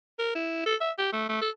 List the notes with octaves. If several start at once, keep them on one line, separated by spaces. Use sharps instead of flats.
A#4
E4
A4
E5
G4
A3
A3
A4